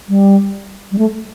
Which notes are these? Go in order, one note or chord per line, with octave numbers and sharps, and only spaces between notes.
G3
G3
A3